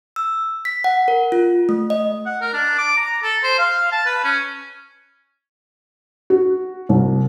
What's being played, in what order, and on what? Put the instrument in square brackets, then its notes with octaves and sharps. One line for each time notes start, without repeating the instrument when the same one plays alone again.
[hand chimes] E6
B6
F#5
A#4
F4
A3
D#5
[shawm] F#5
A#4
D4
D6
A#5
A4
C5
F5
A5
B4
C#4
[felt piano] F#4
C2